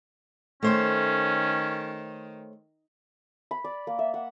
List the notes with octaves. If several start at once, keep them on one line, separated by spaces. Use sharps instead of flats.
D#3 A3 C#4 C5 C#5
B5
D5
A#3
E5
F#5